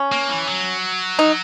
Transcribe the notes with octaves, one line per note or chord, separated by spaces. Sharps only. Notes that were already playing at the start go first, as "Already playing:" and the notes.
Already playing: C#4
A#3
E3
F#3
D#4